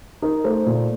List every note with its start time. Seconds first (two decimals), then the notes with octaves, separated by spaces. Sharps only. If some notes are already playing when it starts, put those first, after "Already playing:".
0.22 D#4 A#4
0.44 A3 C5
0.66 A#2